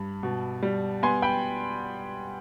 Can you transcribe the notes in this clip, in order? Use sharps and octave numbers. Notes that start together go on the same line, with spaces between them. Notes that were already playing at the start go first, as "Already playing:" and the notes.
Already playing: G2 B5
B2
G3
B3 G#5 C6
G5 B5